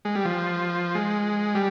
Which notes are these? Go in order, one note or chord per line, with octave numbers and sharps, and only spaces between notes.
G#3
G3
F3
G#3
G3